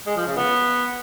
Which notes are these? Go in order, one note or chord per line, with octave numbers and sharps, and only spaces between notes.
G#3
F3
C#3
B3